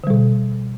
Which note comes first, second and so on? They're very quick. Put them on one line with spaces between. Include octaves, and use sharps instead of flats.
D3 G3 B2